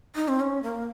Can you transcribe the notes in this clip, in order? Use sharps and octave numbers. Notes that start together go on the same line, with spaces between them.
D#4
C4
C#4
A#3